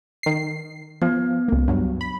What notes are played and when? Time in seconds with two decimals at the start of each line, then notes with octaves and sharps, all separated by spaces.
0.23 D#3 C7
1.02 F3 B3
1.48 C#2 A#3
1.68 G2 F#3
2.01 B5